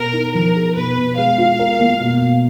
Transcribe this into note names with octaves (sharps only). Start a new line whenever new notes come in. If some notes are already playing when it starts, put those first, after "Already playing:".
Already playing: B2 A#4
D#4
F3 A#4
G#4
B2 B4
B2
G#3 F5
F4
A#4
A#3
B2
B2